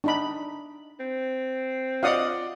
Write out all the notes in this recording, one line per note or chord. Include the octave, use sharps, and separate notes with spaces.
D4 D#4 B5
C4
F4 D5 D#5 F5 F#5 D#6